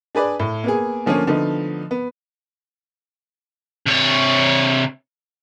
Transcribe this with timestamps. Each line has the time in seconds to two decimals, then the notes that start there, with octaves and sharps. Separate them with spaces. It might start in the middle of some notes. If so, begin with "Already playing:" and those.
0.15 D4 G#4 B4 D5
0.40 A2
0.64 A#3 B3 G#4
1.06 D3 F3 A3 A#3 C#4
1.27 D3 F3 A3 B3 D#4
1.91 B3
3.86 C3 C#5